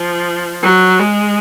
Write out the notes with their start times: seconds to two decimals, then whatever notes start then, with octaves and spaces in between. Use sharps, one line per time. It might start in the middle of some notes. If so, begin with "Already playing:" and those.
Already playing: F3
0.62 F#3
0.99 G#3